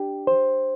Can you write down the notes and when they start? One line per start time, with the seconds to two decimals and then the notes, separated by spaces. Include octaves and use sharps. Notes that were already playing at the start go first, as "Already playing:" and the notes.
Already playing: D4 G4
0.27 C5